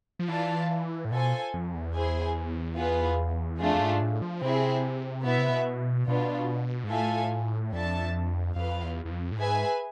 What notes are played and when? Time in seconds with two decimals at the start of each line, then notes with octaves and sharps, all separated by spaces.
0.19 F3
0.29 E3 F4 B4 D5 F5 A5
1.05 A2
1.12 B2 F4 A4 C5 G#5
1.54 F2
1.74 E2
1.95 E4 G#4 C5 G#5
2.77 B3 F4 G#4 B4
3.60 F2 A3 D4 F4 G#4
3.75 F2
3.80 G#2
4.01 A2
4.22 F3
4.42 C3 C4 E4 G#4
5.25 B2 B3 E4 B4 E5
5.38 C3
5.49 B2
6.08 B2 B3 D4 F4
6.84 G#2
6.90 A2 F4 A4 E5 G#5
7.73 F2 D4 A4 E5 A5
8.56 F2 F4 B4 F5
8.83 E2
9.05 E2
9.11 F2
9.32 A2
9.38 G#2 G#4 B4 E5 G#5